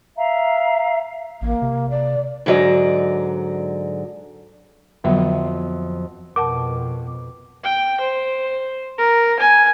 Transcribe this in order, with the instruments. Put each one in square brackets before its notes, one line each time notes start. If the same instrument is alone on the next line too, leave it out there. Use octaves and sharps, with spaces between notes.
[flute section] E5 F5 A#5
[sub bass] A1 [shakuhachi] A#3
[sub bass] C3
[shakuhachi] D5
[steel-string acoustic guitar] G#2 D3 F#3 D5 D#5
[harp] F2 F#3 D#5 [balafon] D3 B3 E5
[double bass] F2 B2 [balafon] A#4 F#5 A5 [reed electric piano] D6
[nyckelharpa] G5
C5
A#4
G#5